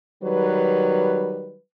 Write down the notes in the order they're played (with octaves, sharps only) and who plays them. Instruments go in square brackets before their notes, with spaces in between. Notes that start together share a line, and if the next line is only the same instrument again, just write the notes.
[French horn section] D#3 F#3 G3 B4